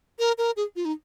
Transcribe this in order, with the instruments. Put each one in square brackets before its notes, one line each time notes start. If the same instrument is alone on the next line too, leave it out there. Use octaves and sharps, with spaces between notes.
[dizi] A#4
A#4
G#4
F4
D#4